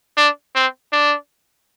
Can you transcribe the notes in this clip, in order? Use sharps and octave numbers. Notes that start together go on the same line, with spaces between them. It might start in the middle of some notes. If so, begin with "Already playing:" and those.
D4
C4
D4